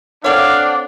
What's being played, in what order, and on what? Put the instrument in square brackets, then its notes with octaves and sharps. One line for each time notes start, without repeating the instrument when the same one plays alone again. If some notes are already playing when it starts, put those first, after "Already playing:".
[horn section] C4 D4 [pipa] A4 C#5 [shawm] F5 [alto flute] F#5